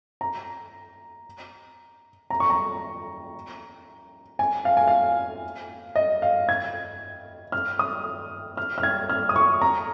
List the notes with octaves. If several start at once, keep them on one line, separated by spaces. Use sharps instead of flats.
A#5
A#5
C#6
A#5
G#5
F5
G#5
F5
D#5
F5
G#6
F6
D#6
F6
F6
G#6
F6
D#6
C#6
A#5